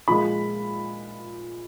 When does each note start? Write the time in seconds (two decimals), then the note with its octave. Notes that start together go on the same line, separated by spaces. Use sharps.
0.08 A#2 F3 G#3 B5